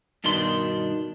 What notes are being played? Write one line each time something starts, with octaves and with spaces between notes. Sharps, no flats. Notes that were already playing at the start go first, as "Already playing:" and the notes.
G2 B2 D#3 D4 C6